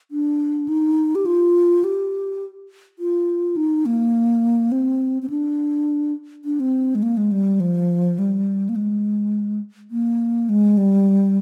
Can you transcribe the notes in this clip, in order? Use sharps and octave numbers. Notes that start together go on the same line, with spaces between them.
D4
D#4
G4
F4
G4
F4
D#4
A#3
C4
C4
D4
D4
C4
G#3
A#3
G#3
G3
F3
G3
A#3
G#3
A#3
G#3
G3